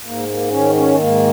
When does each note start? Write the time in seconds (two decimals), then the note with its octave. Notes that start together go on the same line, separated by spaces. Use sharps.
0.05 G#2 A#3
0.28 A#3
0.51 D#3 C#4
0.75 C#4
0.98 G#2 A#3